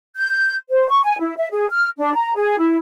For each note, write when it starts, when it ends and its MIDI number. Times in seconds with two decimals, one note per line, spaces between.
0.16 0.55 91
0.69 0.88 72
0.89 1.00 85
1.04 1.16 80
1.20 1.34 64
1.38 1.47 76
1.51 1.66 68
1.71 1.88 89
1.98 2.13 62
2.14 2.32 82
2.35 2.55 68
2.59 2.77 64